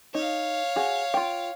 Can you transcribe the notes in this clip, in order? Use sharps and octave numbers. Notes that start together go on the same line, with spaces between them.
D#4 C#5 F5
F#4 G#4
F4 G5